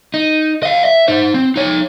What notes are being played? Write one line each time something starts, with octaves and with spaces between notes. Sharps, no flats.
D#4
D#5 F5
E5
D#4 C5
C4
D#4 C#5